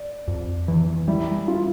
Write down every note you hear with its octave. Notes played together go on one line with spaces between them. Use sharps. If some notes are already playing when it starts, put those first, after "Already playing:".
Already playing: D5
F2
E3
G3 E4
F4